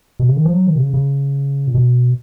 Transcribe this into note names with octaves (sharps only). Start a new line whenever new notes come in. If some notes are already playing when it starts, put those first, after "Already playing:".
B2
C#3
D#3
F3
F#3
D#3
B2
C#3
C#3
A#2
B2